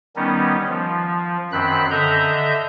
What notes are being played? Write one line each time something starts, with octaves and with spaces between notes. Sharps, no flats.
D#3 G3 B3 C#4 D#4
F3
F#2 D#3 C4 B5 F#6
D3 D#5 E5 A#5 G6